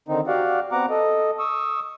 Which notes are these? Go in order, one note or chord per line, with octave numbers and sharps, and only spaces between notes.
D3 D#3 C4 D#4
F#4 G4 D5 F5 F#5
B3 C4 F#5 A#5 D6
A4 D#5
C#6 D#6 E6